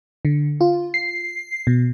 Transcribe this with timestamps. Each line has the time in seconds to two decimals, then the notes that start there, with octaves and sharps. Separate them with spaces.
0.25 D3
0.61 F4
0.94 C7
1.67 B2